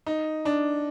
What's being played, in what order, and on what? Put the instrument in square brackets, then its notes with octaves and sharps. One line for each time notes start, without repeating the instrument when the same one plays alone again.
[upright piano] D#4
D4